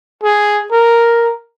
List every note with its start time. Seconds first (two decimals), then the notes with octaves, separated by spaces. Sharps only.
0.23 G#4
0.71 A#4